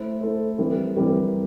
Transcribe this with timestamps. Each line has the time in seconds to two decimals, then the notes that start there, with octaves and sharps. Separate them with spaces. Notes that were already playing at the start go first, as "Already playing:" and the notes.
Already playing: A3 E4 A4 C5
0.21 A3 E4 A4 C5
0.58 E3 G3 C4 G4 A#4
0.97 E3 G3 C4 G4 A#4